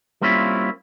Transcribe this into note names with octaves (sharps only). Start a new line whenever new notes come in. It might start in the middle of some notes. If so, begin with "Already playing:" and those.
G3 A#3 C4 C#4 E4 F4